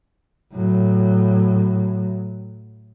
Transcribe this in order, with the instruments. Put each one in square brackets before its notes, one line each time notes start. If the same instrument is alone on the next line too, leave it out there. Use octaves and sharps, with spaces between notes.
[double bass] A2 F#3